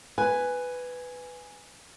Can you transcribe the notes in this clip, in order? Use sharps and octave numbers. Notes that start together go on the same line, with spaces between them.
B4 G#5